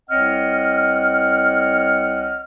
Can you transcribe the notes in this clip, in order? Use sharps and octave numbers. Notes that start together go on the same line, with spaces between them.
C2 C4 C#5 D#5 F#5 F6